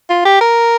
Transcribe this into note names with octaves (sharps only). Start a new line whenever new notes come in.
F4
G4
A#4